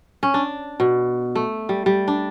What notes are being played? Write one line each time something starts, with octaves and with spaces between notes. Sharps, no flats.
C#4
D4
B2
A3
G3
G3
D4